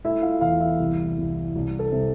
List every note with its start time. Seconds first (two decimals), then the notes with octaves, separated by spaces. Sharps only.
0.05 A3 E4 E5
0.22 F4 F5
0.41 E2 F4 F5
0.60 E4 E5
0.79 C2
1.17 C2
1.55 C2
1.79 A4
1.92 C3